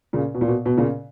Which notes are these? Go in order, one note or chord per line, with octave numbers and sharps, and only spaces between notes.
A#2 C#3
B2
A#2
B2
B2
A#2 C#3